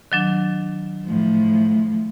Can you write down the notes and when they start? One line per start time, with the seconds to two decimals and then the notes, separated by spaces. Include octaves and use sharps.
0.12 D#3 F#3 D4
1.06 A2 F3